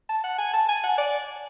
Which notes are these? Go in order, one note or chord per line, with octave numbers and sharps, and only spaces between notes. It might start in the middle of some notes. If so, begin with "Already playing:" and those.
A5
F#5
G#5
A5
G#5
F#5
D5